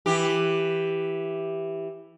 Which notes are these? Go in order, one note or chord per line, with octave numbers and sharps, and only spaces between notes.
E3 G4